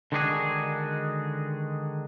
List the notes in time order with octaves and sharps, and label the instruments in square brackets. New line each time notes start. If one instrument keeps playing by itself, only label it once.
[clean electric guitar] D3 D#3 G#3 D4 F#4 G#4